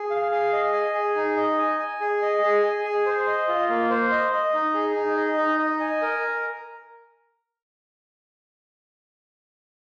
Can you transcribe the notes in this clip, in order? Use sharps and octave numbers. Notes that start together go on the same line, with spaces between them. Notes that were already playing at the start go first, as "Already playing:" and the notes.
Already playing: G#4
F5
G#4
D#5
G#5
G#4
D#4
D#5
G#5
G#5
G#4
D#5
G#4
G#5
G#4
C5
D#5
F4
A#3
C5
D#5
D#5
D#4
G#4
D#4
D#5
D#4
D#5
G#5
A#4